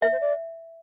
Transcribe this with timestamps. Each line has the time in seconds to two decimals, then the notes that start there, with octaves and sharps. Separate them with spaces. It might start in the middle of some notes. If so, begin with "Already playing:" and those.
0.02 A#4 E5
0.12 C5
0.21 D5